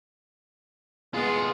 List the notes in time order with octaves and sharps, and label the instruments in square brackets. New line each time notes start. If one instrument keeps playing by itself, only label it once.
[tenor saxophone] G#3 [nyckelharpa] B3 [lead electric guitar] F4 G#4